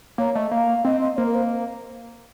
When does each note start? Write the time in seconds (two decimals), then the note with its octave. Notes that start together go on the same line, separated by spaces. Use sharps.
0.18 A#3 C#5
0.35 A3 D#5
0.51 A#3 F5
0.85 C4 D#5
1.01 D#5
1.17 A#3 C5
1.26 A#4
1.34 C5